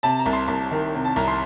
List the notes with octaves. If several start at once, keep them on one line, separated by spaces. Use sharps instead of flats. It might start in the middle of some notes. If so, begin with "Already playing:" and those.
C3 A5
A#5
C2
C6
C2
D#3
C3
A5
C2 A#5
C6